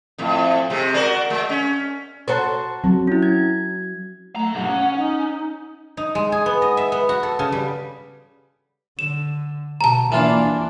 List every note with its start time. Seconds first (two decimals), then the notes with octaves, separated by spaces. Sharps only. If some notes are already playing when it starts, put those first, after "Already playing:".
0.18 F2 A2
0.70 C3 G#3
0.94 F#4 A#4 D5
1.30 G#3
1.50 C#4
2.28 F#4 A4 C5 C#5 A5 A#5
2.84 F#3 C4
3.07 C#4 E4
3.23 G#6
4.36 F#3 A3 A#5
4.55 B1 G2 F#5
4.69 C#4
4.97 D#4
5.97 D#4
6.15 G#3
6.32 G#4
6.46 B3
6.62 D#5
6.77 E5
6.92 B3
7.09 F#4
7.23 A4
7.39 C#3
7.52 G3
8.99 D3 E7
9.81 B2 A5 A#5
10.12 E3 A#3 D4 F4